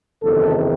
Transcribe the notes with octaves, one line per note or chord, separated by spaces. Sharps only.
F#1 E2 C3 D#3 A4